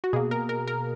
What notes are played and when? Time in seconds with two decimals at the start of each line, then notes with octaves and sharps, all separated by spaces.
0.04 F#4
0.13 B2 A#3 G#4
0.31 A#4
0.49 A#4
0.67 A#4